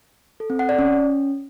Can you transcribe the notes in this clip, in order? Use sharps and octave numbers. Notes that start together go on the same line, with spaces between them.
A4
C4
F#5
D5
C#4